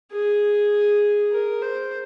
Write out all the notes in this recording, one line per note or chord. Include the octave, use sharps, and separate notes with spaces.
G#4
A#4
C5